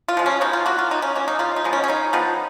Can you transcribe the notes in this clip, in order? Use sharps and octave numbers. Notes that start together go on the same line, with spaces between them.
F4
F3 G#3
C#4
B2 D#4
F4
A#3 F#4
F4
B2 D#4
C#4
A#3 C#4
D#4
C#3 F4
D#4
F3 G#3 B3
C#4
C#4
C#3 D#4
F3 G#3 B3